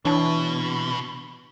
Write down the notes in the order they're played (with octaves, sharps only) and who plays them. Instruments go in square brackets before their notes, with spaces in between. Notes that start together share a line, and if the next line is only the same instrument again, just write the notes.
[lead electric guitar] B2 [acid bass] E3 [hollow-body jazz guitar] D4 C#5 A5